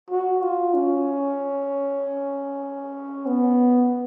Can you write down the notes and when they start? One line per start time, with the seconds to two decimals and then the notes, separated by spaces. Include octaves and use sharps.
0.10 F#4
0.42 F4
0.74 C#4
3.26 B3